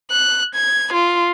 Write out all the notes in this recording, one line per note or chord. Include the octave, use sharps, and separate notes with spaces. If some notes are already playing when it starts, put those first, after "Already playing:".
F#6
G#6
F4